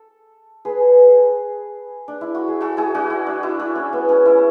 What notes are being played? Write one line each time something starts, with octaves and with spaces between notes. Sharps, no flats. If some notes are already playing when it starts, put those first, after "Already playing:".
Already playing: A4
G#4 B4
D4
E4
F#4
G#4
F#4 A4
E4 G#4
D4 F#4
E4
D4
E4
D4
C#4
B3
C#4
E4